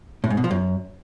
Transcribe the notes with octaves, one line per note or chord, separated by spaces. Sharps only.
A2
G#2
B2
F3
F#2